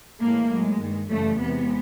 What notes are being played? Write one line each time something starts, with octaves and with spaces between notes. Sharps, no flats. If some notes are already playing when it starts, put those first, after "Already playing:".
A2 E3 G#3 A#3
A2 F#3 G#3
G2 D#3 G#3
F#2 C#3 E3 G3 A3
E2 C3 E3 G#3 B3